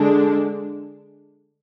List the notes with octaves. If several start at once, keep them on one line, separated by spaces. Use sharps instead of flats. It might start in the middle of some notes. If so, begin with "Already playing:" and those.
Already playing: D3 G#3 D4